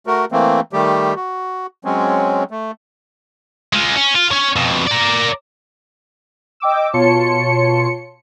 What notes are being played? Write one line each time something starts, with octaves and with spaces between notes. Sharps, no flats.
A3 F#4 A#4
E3 A3 A#3 C4
D#3 G3 A3 G4
F#4
F#3 G#3 C4 C#4
A3
G#3 F4
C#4
F4
C#4 C#5
F2 B2
A#4 D5
D#5 G5 D6 E6
B2 F4 C#5 A5 C6 C#7